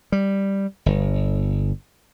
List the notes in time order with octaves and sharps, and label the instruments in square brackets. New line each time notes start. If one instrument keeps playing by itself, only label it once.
[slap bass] G3
G1